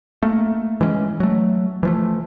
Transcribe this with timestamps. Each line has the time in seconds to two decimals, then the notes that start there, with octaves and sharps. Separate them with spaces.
0.23 A3 A#3
0.81 E3 G#3 A3 C#4
1.20 F#3 A3
1.83 E3 F3 A3